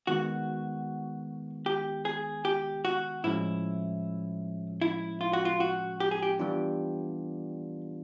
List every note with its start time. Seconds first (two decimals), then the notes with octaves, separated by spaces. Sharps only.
0.07 D#3 G#3 B3 F#4
1.66 G4
2.05 G#4
2.45 G4
2.85 F#4
3.24 A2 F3 G#3 C#4 E4
4.81 E4
5.21 F4
5.33 F#4
5.45 F4
5.60 F#4
6.00 G4
6.11 G#4
6.23 G4
6.39 E3 G3 B3 D4 F4